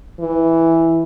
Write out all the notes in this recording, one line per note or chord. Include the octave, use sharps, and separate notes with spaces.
E3